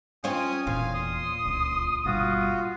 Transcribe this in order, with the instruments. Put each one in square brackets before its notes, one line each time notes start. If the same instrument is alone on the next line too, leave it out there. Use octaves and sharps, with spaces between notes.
[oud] C4 C#4 F4 [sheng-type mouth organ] G#5 D#6
[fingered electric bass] E1 E2 [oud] A#2 [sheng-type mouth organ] F5 G#5
[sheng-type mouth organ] C6 [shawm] D#6
[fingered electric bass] D1 C#2
[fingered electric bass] G1 B2 G3 [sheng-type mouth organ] F4 F#4